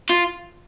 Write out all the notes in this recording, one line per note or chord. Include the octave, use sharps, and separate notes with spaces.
F4